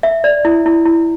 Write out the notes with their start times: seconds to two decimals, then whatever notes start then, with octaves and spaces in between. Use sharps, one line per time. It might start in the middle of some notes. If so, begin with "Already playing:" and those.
0.03 E5
0.24 D5
0.45 E4
0.66 E4
0.86 E4